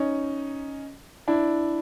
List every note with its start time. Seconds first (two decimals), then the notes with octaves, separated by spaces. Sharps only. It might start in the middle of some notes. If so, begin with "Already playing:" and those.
Already playing: C#4 D#4
1.28 D4 E4